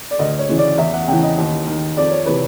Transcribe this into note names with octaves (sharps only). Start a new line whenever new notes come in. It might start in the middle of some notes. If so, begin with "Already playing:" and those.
D5
D2 D#5
C#5
C#3 E3
D5
E2 E5
F#5
C#3 E3 G5
D#5
D#2
D#3
F2 D5
C#5
C3 E3 B4